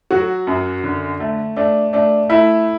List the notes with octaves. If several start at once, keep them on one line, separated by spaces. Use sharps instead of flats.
F#3 F#4
F#2
D3
A3
A3 D4
A3 D4
A3 E4